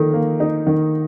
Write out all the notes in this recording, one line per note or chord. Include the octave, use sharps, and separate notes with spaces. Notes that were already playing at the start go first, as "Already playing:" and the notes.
Already playing: D3 D#3 F3 A#3
A#3
D#4
D#3